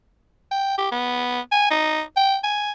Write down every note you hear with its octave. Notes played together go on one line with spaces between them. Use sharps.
G5
G4
B3
G#5
D#4
G5
G#5